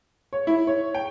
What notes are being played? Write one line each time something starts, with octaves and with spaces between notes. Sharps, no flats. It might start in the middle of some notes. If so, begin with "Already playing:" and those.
C#5
E4
C#5
G5